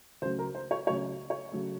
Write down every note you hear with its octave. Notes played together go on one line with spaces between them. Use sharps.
C#2 C#3 F#3 A3 C5
A#4
C5
C#5
C#2 C#3 F#3 A3 C#5
C#5
C#3 F#3 A3